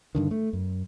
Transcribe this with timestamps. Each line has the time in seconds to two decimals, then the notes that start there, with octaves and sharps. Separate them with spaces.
0.15 G2 D3 D#3
0.31 A3
0.53 F#2